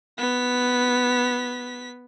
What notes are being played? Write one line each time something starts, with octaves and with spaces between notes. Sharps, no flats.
B3 B6